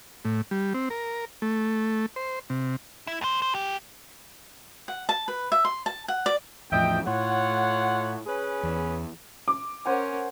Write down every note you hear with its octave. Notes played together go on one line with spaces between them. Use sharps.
A2
G3
C4
A#4
A3
C5
C3
E4
D#2 C5
C5
F#2 G4
F#5
A5
B4
E5
C6
A5
F#5
D5
E2 A2 F3 D#5 E5 G5
A2 F4 C#5 F#5
C#4 G#4 B4
E2
D6
C#4 A#4 C5 F#5 G#5